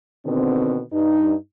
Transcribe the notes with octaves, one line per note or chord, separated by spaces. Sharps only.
B2 D3 D#3 C4
G2 D#4